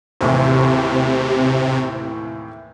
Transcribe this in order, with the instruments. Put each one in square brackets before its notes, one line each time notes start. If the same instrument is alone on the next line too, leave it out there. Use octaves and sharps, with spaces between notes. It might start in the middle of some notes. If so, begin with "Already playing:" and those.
[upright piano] D#2 A2 E3 [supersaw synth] C3